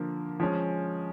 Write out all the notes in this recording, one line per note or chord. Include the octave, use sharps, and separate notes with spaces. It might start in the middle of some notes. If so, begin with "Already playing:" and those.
Already playing: D3 F3 A#3
F3 G#3 C#4